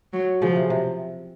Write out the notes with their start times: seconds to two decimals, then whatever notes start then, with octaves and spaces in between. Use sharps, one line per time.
0.13 F#3
0.42 C#3 F3
0.56 C3
0.70 C3